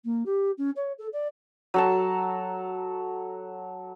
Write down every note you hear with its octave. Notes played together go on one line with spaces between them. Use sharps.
A#3
G4
C#4
C#5
A4
D5
F#3 A4 A5